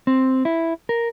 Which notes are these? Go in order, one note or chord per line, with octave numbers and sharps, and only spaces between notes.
C4
E4
A#4